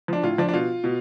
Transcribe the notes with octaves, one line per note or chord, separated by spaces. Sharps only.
F3 D4
A2 F4
F3 D4
D4
B2 F4
B2